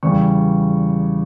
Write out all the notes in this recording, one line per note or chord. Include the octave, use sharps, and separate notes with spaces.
E2 C#3 G3 C#6